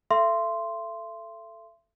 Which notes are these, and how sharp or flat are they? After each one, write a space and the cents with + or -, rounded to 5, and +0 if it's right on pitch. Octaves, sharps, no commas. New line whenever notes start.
A4 +0 E5 +40 C6 -5